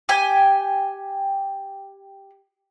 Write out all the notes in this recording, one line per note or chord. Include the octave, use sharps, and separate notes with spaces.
G4 G5 G#5